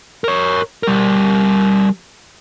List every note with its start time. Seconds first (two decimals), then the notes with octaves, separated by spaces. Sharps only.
0.24 A#4 C#5
0.83 G3 A#4